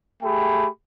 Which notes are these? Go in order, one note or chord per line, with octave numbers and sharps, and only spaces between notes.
A3 G4 G#4 G5 B5